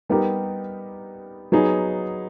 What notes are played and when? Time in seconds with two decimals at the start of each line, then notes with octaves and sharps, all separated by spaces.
0.09 G3 B3 D#4 G4 A#4
1.52 F#3 B3 D#4 G#4